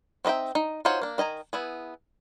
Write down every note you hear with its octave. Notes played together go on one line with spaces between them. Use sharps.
C4 D#4 D#5 E5 G5
D#4
D#4 F4 F#4 C5 C#5
A#3 D4
D#3 D#5 G#5 A#5
B3 E4 G#4